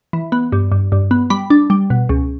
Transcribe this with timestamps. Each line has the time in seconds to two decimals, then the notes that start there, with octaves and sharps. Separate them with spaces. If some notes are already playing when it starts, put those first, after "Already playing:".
0.13 E3
0.32 B3
0.52 G2
0.72 G2
0.92 G2
1.11 B3
1.30 G3 B5
1.50 D4
1.70 G3
1.90 B2
2.09 C#2